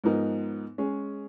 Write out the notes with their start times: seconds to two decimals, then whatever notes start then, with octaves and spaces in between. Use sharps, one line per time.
0.04 G#2 F3 B3 D#4 A#4
0.78 G#3 C#4 G#4